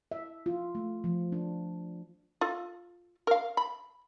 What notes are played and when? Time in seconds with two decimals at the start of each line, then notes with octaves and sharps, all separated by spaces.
0.12 E5
0.46 F4
0.75 A3
1.04 F3
1.32 D4
2.41 F4 A4
3.27 A#4 F5
3.57 B5